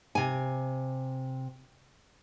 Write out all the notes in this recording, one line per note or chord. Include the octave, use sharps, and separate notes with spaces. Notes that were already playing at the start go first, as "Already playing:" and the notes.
C3 G#5